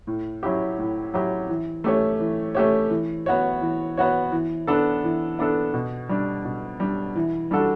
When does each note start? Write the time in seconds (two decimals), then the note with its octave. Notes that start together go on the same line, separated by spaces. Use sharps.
0.07 A2
0.43 F#3 C#4 E4 G4
0.79 A2
1.14 F#3 C#4 E4 G4
1.49 E3
1.84 A3 C#4 G4 C#5
2.20 E3
2.55 A3 C#4 G4 C#5
2.90 E3
3.26 B3 F#4 C#5
3.61 E3
3.97 B3 F#4 C#5
4.32 E3
4.67 B3 D4 A4
5.04 E3
5.39 B3 D4 A4
5.74 B2
6.09 G3 D4
6.45 B2
6.80 G3 D4
7.16 E3
7.51 G3 D4 F#4 A4